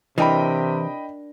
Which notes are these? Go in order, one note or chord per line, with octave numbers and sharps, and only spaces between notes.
C3 E3 D4 A#4 D#5 G5 B5